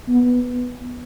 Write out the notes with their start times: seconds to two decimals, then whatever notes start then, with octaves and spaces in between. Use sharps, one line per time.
0.09 B3